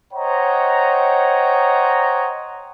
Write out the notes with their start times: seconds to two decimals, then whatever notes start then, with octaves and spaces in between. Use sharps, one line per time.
0.13 C5 C#5 D#5 F#5 G5 A#5